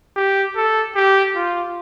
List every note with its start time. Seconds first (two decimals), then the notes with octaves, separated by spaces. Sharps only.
0.16 G4
0.56 A4
0.96 G4
1.36 F4